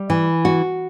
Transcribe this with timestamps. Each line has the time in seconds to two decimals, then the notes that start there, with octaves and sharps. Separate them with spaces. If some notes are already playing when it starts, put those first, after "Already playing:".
Already playing: G3
0.10 E3
0.45 F#4